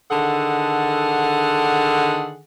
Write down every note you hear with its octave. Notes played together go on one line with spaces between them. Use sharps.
D3 D#3 G#4 A4 F#5